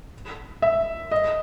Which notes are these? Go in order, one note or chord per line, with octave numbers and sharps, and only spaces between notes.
E5
D#5